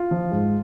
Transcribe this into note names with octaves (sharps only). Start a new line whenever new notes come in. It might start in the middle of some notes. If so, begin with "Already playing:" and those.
Already playing: F4
F3
G#2